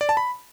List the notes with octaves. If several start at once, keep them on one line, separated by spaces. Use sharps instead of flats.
D5
A5
B5